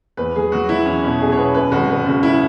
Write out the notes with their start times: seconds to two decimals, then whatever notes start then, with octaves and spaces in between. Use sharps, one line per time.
0.17 E2 B4
0.36 F#3 G#4
0.52 F#3 F#4
0.69 F#3 E4
0.86 E2 C#4
1.04 B2 C#4
1.21 B2 G#4
1.32 C#5
1.37 B2 B4
1.54 F#2 B4
1.71 G#1 F#4
1.89 G#1 B4
2.06 C#3 F#4
2.23 E4